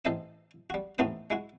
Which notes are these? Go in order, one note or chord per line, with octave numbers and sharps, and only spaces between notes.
A1 A4 C5 D#5 E5 D#6
G3 F#4
A1 D#2 A3 B3 C5 D#6
G#3 E4 F#4